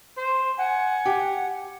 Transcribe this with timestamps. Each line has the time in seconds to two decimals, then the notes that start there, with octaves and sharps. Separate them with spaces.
0.17 C5
0.58 F#5 G#5
1.05 G4